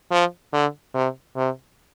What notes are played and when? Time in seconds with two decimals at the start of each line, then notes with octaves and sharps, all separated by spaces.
0.11 F3
0.53 D3
0.94 C3
1.36 C3